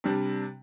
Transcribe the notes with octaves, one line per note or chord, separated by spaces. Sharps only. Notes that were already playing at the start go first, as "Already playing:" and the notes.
C3 G3 D4